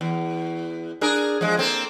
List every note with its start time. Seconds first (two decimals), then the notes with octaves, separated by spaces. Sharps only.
0.01 E2
1.01 D4 G#4 A#4
1.41 F3 G#3
1.57 A#3 C4 A4